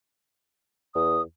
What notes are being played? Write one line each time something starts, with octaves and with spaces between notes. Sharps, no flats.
E2 D#6